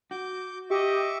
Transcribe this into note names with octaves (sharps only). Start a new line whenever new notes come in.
F#4 D6 G6
G4 D#5 E5 C#6 D6